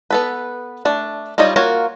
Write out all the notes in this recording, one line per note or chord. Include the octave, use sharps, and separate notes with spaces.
B3 A4 B4
A3 D4
G3 D#4 F4 C#5 D#5
A#3 F4 F#4 A#4 C#5